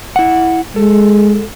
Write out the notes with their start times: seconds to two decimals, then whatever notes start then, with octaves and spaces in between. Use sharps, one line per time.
0.16 E4 F#5
0.76 G#3 A4